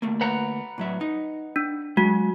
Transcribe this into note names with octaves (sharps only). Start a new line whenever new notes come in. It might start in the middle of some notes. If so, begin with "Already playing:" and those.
D2 A3 A#3
B4 F#5 A#5
A2 F#3 E5
D#4
D4
F#3 G#3 F#4